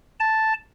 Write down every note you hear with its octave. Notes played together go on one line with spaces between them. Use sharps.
A5